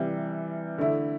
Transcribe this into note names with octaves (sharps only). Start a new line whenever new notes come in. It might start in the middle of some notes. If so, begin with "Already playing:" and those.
Already playing: C3 E3 G3
D3 A3 E4